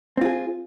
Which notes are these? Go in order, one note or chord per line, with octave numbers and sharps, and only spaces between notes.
C4 F4 G#4